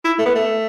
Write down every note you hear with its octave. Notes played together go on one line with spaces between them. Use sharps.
E4
A3
B3
A3